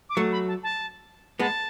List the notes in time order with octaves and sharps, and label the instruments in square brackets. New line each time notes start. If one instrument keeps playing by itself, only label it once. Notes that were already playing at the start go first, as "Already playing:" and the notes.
[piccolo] D6
[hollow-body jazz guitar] F#3 A3 [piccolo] C#6
[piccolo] B5
A5
A5
[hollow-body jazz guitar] G#3 B3 [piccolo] A5